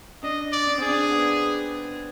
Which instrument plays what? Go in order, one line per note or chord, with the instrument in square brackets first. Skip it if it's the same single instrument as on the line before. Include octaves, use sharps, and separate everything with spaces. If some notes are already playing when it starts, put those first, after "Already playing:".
[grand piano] D4 [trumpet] D#5
[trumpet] D5
[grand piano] D4
[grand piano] C4 [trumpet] G#4
[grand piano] D4
B3